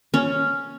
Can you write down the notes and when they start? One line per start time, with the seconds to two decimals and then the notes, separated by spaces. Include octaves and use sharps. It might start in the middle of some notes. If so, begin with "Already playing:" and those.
0.14 C#4